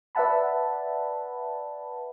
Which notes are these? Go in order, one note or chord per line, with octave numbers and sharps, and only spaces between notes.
B4 D5 E5 F#5 A5 B5